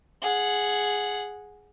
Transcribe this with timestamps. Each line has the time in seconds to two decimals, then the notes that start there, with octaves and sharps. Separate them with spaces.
0.22 G#4 F#5